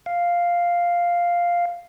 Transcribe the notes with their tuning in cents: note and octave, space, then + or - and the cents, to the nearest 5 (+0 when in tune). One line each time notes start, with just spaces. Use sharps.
F5 +0